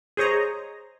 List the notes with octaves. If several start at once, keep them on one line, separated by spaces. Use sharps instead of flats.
G#4 C5 C#5 D#5 A#5